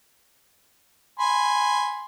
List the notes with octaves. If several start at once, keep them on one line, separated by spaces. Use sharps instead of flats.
G#5 B5 C6